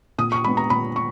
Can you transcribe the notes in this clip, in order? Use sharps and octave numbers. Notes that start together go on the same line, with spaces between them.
A#2 D#6
C#6
G#3 B3 B5
A#5
A#2 B5
C#6